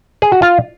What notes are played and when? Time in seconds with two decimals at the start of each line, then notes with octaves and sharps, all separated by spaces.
0.22 G#4
0.32 F#4
0.42 F4